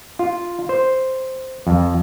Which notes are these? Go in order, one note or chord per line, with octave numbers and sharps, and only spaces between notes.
F4
C5
F2